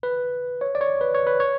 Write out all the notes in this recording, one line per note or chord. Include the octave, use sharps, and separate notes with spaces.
B4
C#5
D5
C#5
B4
C#5
B4
C#5